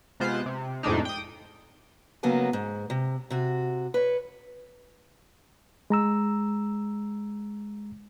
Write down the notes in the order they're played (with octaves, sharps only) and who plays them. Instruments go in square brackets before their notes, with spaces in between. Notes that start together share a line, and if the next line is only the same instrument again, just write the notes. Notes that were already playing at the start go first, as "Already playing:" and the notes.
[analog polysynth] C3 G#3 B3 F4 C5 F#6
C3
F2 A2 C3 G#3 D4 D#4
G5 D#6
[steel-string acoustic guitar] F2 C#3 F#3 A#3 B3 G#5
G#2
C3
C3 F#4
B4 C#5
[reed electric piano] G#3 A#5 E6